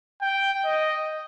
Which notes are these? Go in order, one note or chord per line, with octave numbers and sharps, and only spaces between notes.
G5
D#5